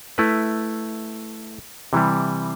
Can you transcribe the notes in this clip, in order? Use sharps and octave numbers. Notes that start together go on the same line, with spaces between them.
A3 E4 B4
C3 E3 G3